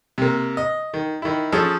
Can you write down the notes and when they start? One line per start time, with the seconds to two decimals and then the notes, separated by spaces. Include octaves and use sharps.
0.18 C3 A#3
0.57 D#5
0.94 D#3
1.22 D#3 E4
1.52 F3 C#4 G#4 A4